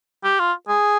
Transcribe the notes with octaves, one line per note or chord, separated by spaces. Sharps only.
G4
F4
G#4